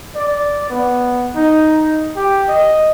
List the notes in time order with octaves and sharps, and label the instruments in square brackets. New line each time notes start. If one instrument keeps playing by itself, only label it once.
[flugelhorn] D5
B3
D#4
G4
D#5